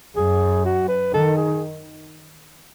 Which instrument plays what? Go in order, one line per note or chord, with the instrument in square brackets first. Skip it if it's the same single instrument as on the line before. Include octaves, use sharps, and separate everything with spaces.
[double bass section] F#2 [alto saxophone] G#4
[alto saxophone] F#4
B4
[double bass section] D#3 [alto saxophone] A4
[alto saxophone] G#4